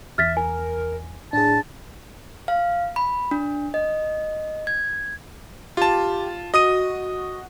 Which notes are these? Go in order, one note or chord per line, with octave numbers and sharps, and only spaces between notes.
E2 E5 F6 A6 B6
A#4 G#5
A2 D4 G#4 A5
F5
B5
D4
D#5
G#6
F4 G4 A5
F#4 D#5 D#6 D#7